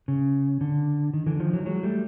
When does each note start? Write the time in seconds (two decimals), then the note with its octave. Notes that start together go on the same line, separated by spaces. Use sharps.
0.08 C#3
0.61 D3
1.14 D#3
1.26 D3 E3
1.40 D#3 F3
1.53 E3 F#3
1.66 F#3 G#3
1.83 G3 A3